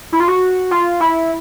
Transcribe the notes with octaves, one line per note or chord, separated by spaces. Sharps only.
E4
F4
F#4
F4
E4